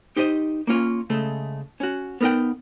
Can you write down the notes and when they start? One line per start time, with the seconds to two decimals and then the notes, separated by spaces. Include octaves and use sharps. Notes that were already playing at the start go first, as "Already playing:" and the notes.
0.16 D#4 G4 C5 C#5 D#5
0.67 A#3 C#4 F4 C#5
1.10 C#3 G#3 A3 A4
1.80 C#4 F#4
2.21 B3 D#4 A#4 C#5 F#5 G5